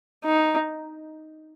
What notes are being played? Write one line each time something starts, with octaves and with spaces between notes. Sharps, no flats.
D#4